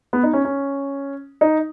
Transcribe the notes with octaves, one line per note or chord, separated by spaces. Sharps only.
B3
D#4
C#4
C#4
D#4